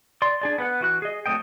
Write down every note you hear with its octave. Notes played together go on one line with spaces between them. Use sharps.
D5 C6
D4 G#4 D5
B3 B4 F#5
E3 F#4 F#6
G#4 D#5
F#3 A3 C4 D#5 G5